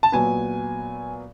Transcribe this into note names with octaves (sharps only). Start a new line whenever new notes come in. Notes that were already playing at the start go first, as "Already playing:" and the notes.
A5
A#2 F#3 B3 G#5